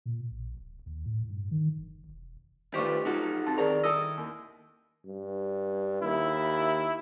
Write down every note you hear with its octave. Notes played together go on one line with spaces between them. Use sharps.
A#2
A#1
D1
D#2
A2
G2
D#3
F#1
E1
D#3 A3 D4 F4 G4 B4 C5 C#6
F3 F#3 D#4 F#4 A4
F2 A5 A6
D#3 C4 G#4 A#4 D5 A#5
E4 A4 D#5 E6
D#2
G2
D#2 E4